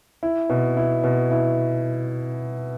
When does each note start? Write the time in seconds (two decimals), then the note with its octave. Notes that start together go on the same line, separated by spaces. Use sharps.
0.23 E4
0.50 B2
0.77 E4
1.04 B2
1.31 E4